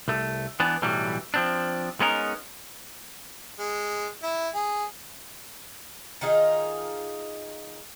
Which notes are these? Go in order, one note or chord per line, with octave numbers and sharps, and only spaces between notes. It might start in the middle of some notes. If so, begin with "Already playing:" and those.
C2 A3
E3 B3 D4
B1 A2 E3 F#3 G3
F3 C4 D4
G#3 B3 C#4 D#4 A#4
G#3
E4
G#4
D#3 D#4 F4 G#4